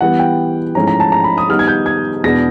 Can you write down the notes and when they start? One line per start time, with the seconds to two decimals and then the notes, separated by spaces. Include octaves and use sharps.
0.01 E3 G3 B3 F#5
0.19 G5
0.75 G#2 F3 A3 C#4 E4 A#5
0.88 A#5
1.00 A5
1.12 A#5
1.24 B5
1.38 D#6
1.49 D#3 G3 B3 D#4 F6
1.59 G#6
1.68 G6
1.86 G#6
2.24 E2 B2 G#3 B3 D4 A#6